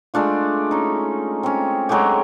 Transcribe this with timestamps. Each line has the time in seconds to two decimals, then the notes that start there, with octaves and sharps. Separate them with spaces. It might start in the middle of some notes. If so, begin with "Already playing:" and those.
0.14 G#3 A3 D4 F4
0.71 C#4 D#4
1.43 C4 C#4
1.89 F#3 G#3 A3 G4